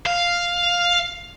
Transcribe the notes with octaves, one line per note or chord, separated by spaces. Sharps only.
F5